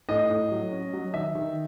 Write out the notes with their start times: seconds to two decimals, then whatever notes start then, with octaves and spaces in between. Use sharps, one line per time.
0.09 A2 D#5
0.30 A2
0.51 F#3
0.72 C#4
0.93 F#3
1.14 D#3 E5
1.35 D#3